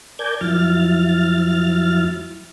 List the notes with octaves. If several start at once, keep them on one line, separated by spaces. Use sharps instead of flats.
A#4 D5 G#5 A5 G6 G#6
F2 F3 F#3 E4 F6 A6